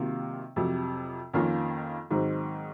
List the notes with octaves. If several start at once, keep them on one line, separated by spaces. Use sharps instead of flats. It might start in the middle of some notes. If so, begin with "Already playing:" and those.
Already playing: C3 D#3 F#3 A#3 F4
F2 C3 F#3
F2 D#3 A#3 C#4 F4
G#2 D#3 F#3 C4 D#4